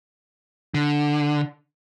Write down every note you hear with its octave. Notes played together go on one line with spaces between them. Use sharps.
D3